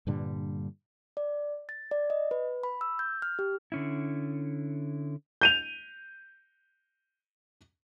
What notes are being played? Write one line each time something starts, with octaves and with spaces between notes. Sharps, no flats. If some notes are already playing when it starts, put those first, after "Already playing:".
G2 A#2 D3 G3
D5
A6
D5
D#5
B4
B5
E6
G6
F6
G4
D3 C#4 E4
G6 D#7 F7